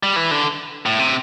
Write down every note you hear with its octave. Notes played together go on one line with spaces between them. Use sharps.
G3
E3
D3
A2
C3